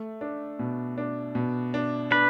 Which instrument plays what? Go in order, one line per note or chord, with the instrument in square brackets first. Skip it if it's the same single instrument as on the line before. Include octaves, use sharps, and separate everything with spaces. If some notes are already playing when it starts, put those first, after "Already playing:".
Already playing: [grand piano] A3
D4
B2
D4
B2
D4
[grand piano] D4 [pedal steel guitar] B4